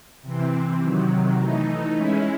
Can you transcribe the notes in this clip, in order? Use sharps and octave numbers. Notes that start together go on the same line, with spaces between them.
C3 E3 C4
C3 D#3 F#3
E3 A3 D#4
G#3 C#4 E4